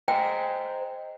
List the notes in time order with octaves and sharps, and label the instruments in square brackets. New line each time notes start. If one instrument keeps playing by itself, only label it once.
[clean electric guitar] C5 D#5 A#5 [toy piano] G5